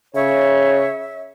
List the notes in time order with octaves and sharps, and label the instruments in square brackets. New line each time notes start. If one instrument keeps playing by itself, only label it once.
[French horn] C#3 [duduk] C#5 [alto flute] E5